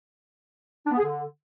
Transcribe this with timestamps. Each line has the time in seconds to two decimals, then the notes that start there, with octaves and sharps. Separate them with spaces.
0.86 D4
0.92 B3
0.98 G#4
1.03 D3